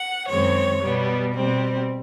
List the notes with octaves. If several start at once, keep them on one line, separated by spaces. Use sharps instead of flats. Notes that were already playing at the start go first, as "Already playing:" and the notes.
Already playing: F#5
F#2 D#3 G#3 C4 C#5
B2 G3 B3
B2 G3 C4